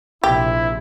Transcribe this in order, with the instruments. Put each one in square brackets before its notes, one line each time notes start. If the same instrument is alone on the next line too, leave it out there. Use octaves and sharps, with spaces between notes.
[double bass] A#1 C3 [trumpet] E4 [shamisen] G4